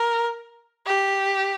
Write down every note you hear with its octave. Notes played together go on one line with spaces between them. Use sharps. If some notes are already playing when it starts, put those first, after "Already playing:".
Already playing: A#4
G4